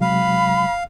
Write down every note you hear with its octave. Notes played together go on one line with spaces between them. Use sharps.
C3 F#3 G#3 F5 B5